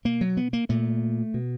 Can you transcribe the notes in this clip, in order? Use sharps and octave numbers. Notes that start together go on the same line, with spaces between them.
B2 A#3
F#3
B3
A#3
A#2 A3
B2